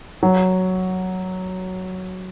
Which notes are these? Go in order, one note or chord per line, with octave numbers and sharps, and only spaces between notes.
F#3